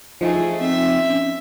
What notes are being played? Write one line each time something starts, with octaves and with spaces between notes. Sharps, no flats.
F3 A3 D#4 G#4
C4 E5
C#4